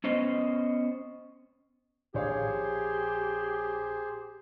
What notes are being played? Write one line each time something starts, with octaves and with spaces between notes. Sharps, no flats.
B3 C#4 C5 D#5
A#1 G4 G#4 C5 C#5 F5